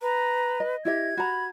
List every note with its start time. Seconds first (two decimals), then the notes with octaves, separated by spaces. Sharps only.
0.02 B4 A#5
0.60 D#5
0.85 E4 G4 D#5 E5 G#6
1.17 F#4 A#5 B5